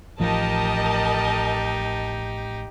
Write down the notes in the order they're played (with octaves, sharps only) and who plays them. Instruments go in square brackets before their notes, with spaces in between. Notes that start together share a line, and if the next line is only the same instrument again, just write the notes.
[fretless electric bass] A1 F3 [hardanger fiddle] D#4 G4 [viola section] A#4 D#5 A5